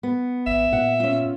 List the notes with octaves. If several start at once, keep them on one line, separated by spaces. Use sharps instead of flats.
B3
G#1 E5
A#2 F#5
C#4 F4